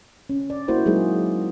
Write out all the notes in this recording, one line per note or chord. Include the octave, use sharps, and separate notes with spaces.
C#4
D5
A#3 E4 F#4 C5
F#3 G#3 A#3 D#4 G#4